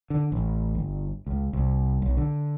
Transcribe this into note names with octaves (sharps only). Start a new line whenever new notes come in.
D3
A1
G1
C#2
C2
B1
D3